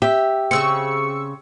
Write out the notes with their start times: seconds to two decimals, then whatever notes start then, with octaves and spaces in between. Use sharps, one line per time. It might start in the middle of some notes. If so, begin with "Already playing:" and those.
0.02 G4 E5
0.51 C#3 C4 C#6 E6 C#7